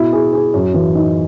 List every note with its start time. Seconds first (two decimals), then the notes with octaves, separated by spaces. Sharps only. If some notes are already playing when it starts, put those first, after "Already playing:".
Already playing: B2 E4
0.12 G#4
0.33 G#4
0.54 F#2
0.74 E3
0.95 D#4